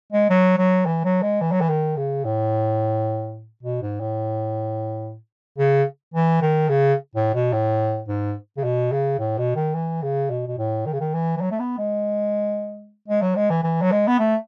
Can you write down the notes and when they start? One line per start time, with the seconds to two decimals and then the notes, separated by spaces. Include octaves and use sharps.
0.12 G#3
0.30 F#3
0.58 F#3
0.86 E3
1.04 F#3
1.22 G#3
1.41 E3
1.52 F#3
1.61 E3
1.69 D#3
1.97 C#3
2.25 A2
3.63 B2
3.82 G#2
4.00 A2
5.58 C#3
6.14 E3
6.42 D#3
6.69 C#3
7.15 A2
7.34 B2
7.53 A2
8.08 G#2
8.57 C#3
8.64 B2
8.92 C#3
9.19 A2
9.38 B2
9.56 D#3
9.74 E3
10.02 C#3
10.30 B2
10.47 B2
10.58 A2
10.86 D#3
10.93 C#3
11.00 D#3
11.14 E3
11.37 E3
11.41 F#3
11.51 A3
11.60 B3
11.78 G#3
13.08 G#3
13.22 F#3
13.36 G#3
13.50 E3
13.63 E3
13.81 F#3
13.92 G#3
14.08 B3
14.19 A3